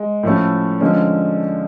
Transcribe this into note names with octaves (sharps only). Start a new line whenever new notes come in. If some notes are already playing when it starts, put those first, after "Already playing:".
Already playing: G#3
A2 F3 A3 C#4
D3 F3 G#3 C#4